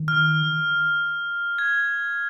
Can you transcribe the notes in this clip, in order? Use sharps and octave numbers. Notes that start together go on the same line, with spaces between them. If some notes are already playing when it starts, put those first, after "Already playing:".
Already playing: D#3
F6
G#6